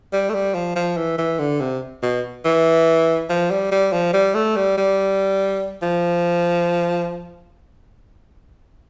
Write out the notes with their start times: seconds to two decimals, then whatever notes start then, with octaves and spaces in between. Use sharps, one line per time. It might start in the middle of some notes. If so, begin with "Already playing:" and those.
0.13 G3
0.29 A3
0.34 G3
0.55 F3
0.76 F3
0.97 E3
1.18 E3
1.39 D3
1.60 C3
2.03 B2
2.45 E3
3.30 F3
3.51 G3
3.72 G3
3.93 F3
4.13 G3
4.34 A3
4.56 G3
4.78 G3
5.82 F3